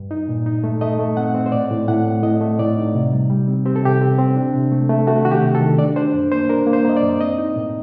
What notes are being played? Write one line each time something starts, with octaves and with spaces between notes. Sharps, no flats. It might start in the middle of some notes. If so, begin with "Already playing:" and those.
Already playing: G2
D#4
A#2
D#4
A3
A3 D#5
A3
C4 F#5
C4
C5
A2 D5
A2
A2 F#5
A3
A2 D#5
A3
A2 D5
D#4
C3
G3
G3
C4
C4 G4
A4
C3 G4
C4
C4
D4
C3
A3
A3
A3 F#4
D#3 F#4
G4
C3
A4
D#3
D4 D5
D4 C5
F#2
A#3 C5
D4 A#4
A#3
C5
A#3 D#5
D5
F#2
C4 D#5
D#4
A2